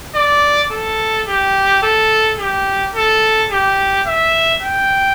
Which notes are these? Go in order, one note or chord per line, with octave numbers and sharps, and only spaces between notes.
D5
A4
G4
A4
G4
A4
G4
E5
G5